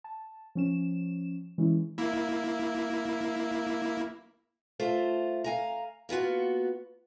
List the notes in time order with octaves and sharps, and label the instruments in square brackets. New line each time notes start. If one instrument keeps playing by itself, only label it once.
[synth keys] A5
F3 C#4 E7
E3 G#3 C#4 E4
[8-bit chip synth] A#3 E4
[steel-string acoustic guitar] A3 F4 C5
F5 G#5 A#5
A#3 B3 F4 F#4